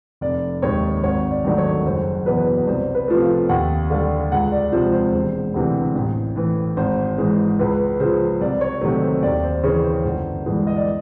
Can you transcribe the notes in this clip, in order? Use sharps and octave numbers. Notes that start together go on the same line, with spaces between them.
F1 D5
D#2 D#3 G#3 C#5
G#1 C#5
D5
G2 D#3 F#3 A3 D5
C#5
F#1 C5
E2 B2 B4
C2 C5
B4
C3 F3 A3
F5
D#2 F#5
D3 G3 F5
C#2 F#5
D5
C3 F3 G#3 C5
C5
E1
D2 C3 E3
A1
A2 E3
G#1 C5
G#2 E3 G#3
C#2 B4
C#3 F3 C5
C2 D5
C#5
C3 D#3 F#3 A3 C#5
C5
D#2 D5
C5
C#3 E3 C#5
C5
G1
G2 E3 G#3
D#5
D5